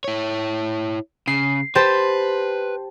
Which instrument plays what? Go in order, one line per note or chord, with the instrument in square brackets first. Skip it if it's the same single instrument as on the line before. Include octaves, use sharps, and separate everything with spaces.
[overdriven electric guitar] E4 C#5
[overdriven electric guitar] C#3 [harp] C7
[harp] G4 C5 A5 [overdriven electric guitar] B4